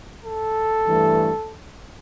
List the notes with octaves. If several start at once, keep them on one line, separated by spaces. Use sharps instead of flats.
A4
G2 E3 A3